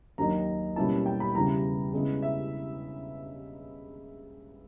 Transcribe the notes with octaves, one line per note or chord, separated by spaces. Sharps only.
D#2 D#3 F#3 A#3 D#4 A#5
B2 G3 A#3 C#4 E4 A5
G5
B5
E2 C#3 E3 G3 A#5
C#3 E3 G#3 B3 E4
E5